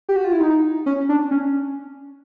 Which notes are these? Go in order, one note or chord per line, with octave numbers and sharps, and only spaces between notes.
G4
F#4
F4
E4
D#4
C#4
D4
C#4